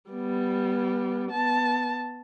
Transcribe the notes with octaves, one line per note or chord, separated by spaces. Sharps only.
G3 B3
B3 A5